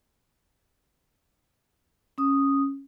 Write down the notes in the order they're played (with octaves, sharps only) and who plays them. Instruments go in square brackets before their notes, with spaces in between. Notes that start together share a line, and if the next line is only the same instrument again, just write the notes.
[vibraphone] C#4 D#6